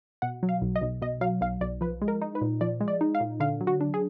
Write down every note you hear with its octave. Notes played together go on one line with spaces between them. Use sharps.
B2 F#5
F#3
F5
B1
D#5
B1
B2 D#5
F#3 F5
B1 F5
B1 D5
F3 B4
G#3
A#4
D#4
B4
A#2
F3 D5
G#3
D5
D#4
F5
A#2
D3 F5
F#3
F#4
D4
G#4